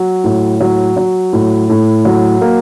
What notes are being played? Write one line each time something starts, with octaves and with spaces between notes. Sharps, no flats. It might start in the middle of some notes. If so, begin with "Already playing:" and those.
Already playing: F#3
A2
F#3
F#3
A2
A2
F#3
A#3